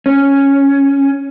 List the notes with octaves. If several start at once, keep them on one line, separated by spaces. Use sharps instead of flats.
C#4